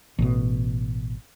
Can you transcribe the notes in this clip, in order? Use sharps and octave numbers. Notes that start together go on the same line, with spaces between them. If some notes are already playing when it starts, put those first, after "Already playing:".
A1 B2